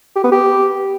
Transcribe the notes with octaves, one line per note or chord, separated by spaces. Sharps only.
G4
B3
G4